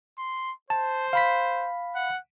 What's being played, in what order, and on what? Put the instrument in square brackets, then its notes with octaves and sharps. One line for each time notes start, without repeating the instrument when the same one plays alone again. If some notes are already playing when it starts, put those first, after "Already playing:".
[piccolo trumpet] C6
[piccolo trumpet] C5 [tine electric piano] A5
[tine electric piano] F5 B5 B6
[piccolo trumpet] F#5